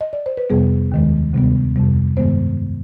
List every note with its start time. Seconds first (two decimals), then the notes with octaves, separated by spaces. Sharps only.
0.01 D#5
0.13 D5
0.26 C5
0.37 B4
0.50 F2 C3 G3 B3 G#4
0.92 D#2 D#3 G#3
1.33 D2 C3 G3 B3
1.76 F2 C3 G3
2.17 G2 D#3 G#3 B3 C5